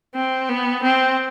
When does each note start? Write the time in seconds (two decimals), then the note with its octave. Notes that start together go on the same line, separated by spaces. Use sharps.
0.15 C4
0.49 B3
0.83 C4